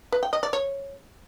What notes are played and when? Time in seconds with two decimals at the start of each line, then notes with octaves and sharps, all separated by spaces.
0.12 B4
0.23 G5
0.33 D#5
0.43 D5
0.53 C#5